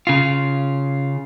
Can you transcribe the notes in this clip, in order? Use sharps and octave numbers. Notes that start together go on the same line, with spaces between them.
C#3 F4